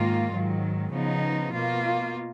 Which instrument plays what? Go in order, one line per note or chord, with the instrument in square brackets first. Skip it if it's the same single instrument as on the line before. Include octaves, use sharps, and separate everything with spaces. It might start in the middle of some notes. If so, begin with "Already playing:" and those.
Already playing: [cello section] G#2 D#3 A#3 F4
G#2 D#3 F#3
C#3 F3 B3 D#4
B2 A#3 F4